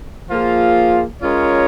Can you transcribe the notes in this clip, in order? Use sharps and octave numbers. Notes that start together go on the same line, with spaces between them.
F3 A#3 F4 G#4
G#3 C#4 F4 A#4 C#5